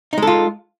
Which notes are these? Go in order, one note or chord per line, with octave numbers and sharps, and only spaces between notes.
G#3 D#4 F4 A4